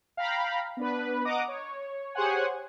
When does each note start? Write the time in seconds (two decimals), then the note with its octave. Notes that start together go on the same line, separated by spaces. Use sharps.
0.17 F5 G5 A#5 B5
0.77 B3 D4 B4
1.25 D#5 F#5 A#5 D6 D#6
1.48 C#5
2.15 G4 G#4 C5 C#5 F#5 G#5